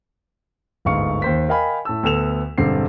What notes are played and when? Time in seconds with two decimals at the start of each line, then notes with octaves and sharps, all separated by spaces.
0.85 G1 D2 G#2 F5 C#6 C#7
1.22 D#2 C5 B6
1.49 A#4 D#5 F5 G5 G#5 B5
1.85 A2 A5 E6
2.03 D2 B3 A4 E7 F7
2.58 E1 G2 D3 C4 C7